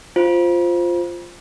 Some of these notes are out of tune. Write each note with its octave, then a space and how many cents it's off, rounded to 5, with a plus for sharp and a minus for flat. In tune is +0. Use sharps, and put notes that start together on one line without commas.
F4 +0 C5 +0